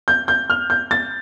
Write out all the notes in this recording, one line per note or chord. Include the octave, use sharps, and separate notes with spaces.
G6
G6
F6
G6
A6